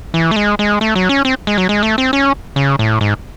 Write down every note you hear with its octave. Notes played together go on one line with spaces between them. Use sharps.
E3
A3
G#3
G#3
A3
F#3
C#4
C4
G#3
F#3
G#3
A3
C4
C#4
C#3
A2
G#2